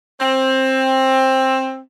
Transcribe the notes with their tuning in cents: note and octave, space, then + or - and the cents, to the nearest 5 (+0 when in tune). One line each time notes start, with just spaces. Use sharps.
C4 +15